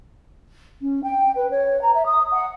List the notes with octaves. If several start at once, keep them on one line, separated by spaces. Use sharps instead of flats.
C#4
G5
B4
C#5
A#5
E5
D#6
F#5